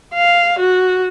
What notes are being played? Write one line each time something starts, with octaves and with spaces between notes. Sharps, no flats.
F5
F#4